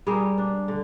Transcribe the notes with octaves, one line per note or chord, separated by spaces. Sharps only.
G3 G#4 A#4
D4
D3